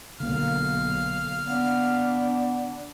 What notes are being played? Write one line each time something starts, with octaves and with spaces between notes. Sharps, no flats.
B1 D3 A#3 F5 F6
B3 D4